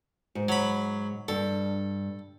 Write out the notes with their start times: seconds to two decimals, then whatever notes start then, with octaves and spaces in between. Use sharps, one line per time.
0.35 G#2
0.49 F#3 B5
1.28 G2 A4